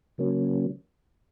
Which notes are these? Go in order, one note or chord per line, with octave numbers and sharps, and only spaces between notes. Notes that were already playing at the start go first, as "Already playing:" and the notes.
C#3 F#3 A#3 C#4